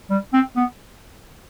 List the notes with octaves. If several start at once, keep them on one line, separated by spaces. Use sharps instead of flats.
G3
C4
B3